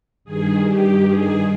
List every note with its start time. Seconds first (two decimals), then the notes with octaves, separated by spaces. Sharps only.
0.24 G2 D#3 G#4
0.66 G4
1.07 G#4